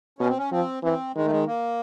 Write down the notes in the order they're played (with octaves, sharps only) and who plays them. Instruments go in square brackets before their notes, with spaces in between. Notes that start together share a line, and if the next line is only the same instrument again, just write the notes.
[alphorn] B2 [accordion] C#4
[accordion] C4
C#4
[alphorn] F3 [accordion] C4
[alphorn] E3 [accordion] C4
[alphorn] D#3 [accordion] G#3
[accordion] A3
G#3
A#3